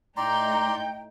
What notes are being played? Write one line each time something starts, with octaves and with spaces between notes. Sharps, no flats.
A2 D#4 D5 G5 A#5 C6 G6